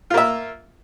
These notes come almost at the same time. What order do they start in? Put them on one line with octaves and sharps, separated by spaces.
F4 A#3 E5